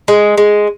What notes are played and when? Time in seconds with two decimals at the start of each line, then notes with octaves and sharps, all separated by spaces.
0.08 G#3
0.38 G#3